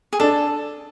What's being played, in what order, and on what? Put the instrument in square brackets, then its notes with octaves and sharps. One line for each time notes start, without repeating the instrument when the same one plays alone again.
[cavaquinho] G#4
[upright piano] D4 [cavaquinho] A4